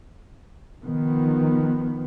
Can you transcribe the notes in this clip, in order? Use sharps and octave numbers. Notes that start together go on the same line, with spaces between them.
D#3 F3 B3